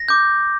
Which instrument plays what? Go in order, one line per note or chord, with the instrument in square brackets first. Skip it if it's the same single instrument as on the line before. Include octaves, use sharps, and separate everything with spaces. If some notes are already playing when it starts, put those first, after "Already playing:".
Already playing: [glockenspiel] A#6
D6 G6